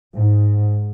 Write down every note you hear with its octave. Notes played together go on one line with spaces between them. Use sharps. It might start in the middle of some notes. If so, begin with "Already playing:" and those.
G#2